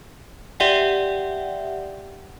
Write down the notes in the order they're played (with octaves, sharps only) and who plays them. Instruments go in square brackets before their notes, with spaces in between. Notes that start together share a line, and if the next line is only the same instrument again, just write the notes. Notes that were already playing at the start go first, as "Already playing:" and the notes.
[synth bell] G4 D5 E5 F#5 G5